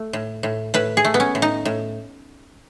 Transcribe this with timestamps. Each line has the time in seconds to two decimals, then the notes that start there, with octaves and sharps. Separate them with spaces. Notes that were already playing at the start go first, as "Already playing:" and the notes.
Already playing: A3
0.13 A2
0.43 A2
0.74 A2 B4
0.97 G#4
1.05 A3
1.14 B3
1.20 C#4
1.35 A2
1.42 D#4
1.65 A2